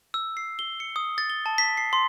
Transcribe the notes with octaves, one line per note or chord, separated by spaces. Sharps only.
E6
C7
G7
C#7
D#6
A6
G7
A5
B6
C7
C6